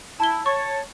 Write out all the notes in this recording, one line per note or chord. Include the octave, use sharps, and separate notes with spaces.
E4 A5 G7
C#5 A5 C#6